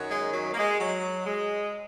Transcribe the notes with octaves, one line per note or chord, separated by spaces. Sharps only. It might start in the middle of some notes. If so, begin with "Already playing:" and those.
Already playing: F#2 D#3 F#3
G#3
F#3
A#3
G#3
F#3
G#3